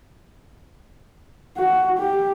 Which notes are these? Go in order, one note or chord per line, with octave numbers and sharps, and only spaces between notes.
F#4
G4